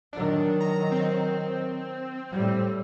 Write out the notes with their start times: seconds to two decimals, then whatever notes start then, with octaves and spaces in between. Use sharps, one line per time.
0.13 D#3 F#3 D4
0.61 A#5
0.92 C4
2.31 A2 G3